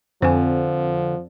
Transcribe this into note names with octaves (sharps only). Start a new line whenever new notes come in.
F2 D3 F3 C5 G#5